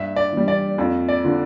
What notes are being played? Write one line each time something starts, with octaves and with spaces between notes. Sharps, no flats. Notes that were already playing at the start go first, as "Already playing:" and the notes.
Already playing: G2 E5
D5
E3 G3
D5
F2
D5
D3 F3